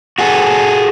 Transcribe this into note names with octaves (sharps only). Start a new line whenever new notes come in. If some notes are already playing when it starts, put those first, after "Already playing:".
F#4 G#4 A4